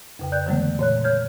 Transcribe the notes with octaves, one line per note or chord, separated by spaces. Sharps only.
F2 C#3 G5
D5 F#6 G6
D3 E3 F#3 G#3 A3 B3
A#2 C#5 F#6
C#5 F6 G6 G#6